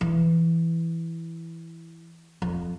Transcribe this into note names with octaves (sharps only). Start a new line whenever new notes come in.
E3
F2